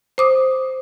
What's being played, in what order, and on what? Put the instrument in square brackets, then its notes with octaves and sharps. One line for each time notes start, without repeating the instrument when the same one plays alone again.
[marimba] C5 D6 D#6